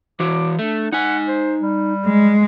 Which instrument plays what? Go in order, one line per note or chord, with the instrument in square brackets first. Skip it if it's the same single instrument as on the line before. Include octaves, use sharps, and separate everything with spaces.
[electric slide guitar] E3 F#4 [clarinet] D6
[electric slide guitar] A3 [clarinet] D4
[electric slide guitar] D#4 G#5 [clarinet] F#5
[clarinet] C5
G3
[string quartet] G#3